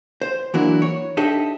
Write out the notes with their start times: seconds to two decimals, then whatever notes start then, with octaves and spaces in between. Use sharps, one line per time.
0.22 C5
0.54 E3 F#3 A#3 D4 E4 F#4
0.82 C#5
1.17 D4 D#4 G4 A4 D#5 E5